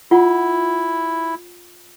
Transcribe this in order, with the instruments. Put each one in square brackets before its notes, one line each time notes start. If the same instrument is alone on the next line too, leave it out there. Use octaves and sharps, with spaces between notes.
[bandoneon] E4 [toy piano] F4 F#5